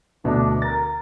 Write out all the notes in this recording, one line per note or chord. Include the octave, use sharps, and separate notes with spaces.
D2 B2 A3 D4
A#4 A6